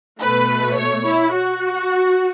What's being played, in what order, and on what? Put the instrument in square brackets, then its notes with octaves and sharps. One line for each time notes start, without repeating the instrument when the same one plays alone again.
[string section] B2 A3 B4
C#5
E4
F#4